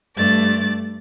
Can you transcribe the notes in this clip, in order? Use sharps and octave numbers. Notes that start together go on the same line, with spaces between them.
G2 A3 D5 A6